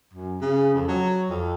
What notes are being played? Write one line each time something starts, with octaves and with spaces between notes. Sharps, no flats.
F#2
C#3
F2
F#3
F2